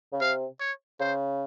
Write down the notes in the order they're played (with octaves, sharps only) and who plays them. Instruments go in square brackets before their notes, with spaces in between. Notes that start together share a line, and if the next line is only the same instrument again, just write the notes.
[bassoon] C#3
[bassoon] C3 [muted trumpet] F5
[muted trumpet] C#5
[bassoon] C#3 [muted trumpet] C5